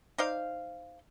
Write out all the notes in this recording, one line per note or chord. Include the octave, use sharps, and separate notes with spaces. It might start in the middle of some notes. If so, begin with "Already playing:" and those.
D#4 C5 D5 F5